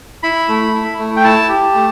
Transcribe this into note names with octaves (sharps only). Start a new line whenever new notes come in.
E4 B5
A3
E4
A3
G5
E4 A5
G4
A3